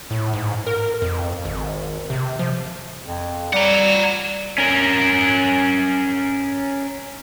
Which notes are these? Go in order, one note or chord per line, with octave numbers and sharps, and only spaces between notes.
A2
G#2
A#4
F2
G#1
C3
F3
F2
G3 F#5 A#5
C#4 A#4